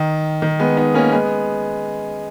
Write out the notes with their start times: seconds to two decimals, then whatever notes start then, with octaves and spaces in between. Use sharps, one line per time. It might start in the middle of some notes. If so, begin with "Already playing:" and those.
Already playing: D#3
0.42 D#3
0.59 G#3 B3
0.77 B3 D#4
0.94 A#3 C#4
1.12 G#3 B3